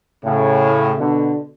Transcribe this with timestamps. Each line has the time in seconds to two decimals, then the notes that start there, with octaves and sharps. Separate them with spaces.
0.24 A2 C#3
0.99 B2 D3